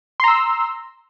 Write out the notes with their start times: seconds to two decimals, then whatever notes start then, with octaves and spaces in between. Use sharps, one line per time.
0.20 C6
0.24 A#5
0.28 E6